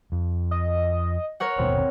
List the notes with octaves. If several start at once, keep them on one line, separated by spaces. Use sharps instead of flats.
F2
D#5
A#4 C#5 F#5
G1 D#2 B2 C4